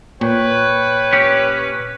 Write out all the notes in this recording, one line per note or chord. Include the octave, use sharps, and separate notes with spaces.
A#2 B4 C#5 G5 C#6
C#4 G4